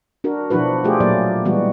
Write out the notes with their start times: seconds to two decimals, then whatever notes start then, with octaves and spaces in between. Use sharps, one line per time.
0.24 D4 F#4 A#4
0.50 B2 F3 D4 E4 F#4 B4
0.84 A3 F4 G4 G#4
1.00 A#2 F#3 A#3 D5
1.45 E3 G3 G#3 B3 F#4